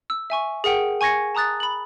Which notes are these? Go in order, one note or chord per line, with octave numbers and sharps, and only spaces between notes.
E6
E5 G#5 C#6
G#4 A#4 F#5 G5
G#5 C#6 G#6 A#6 C#7
A5 A#5 D#6 F#6 A6
B5 F#7